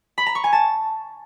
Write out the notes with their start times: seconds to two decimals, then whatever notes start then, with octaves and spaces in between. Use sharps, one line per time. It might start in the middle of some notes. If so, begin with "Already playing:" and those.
0.18 B5
0.26 A#5
0.35 C#6
0.44 G#5
0.53 A5